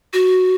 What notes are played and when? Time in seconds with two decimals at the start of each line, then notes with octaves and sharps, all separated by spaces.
0.13 F#4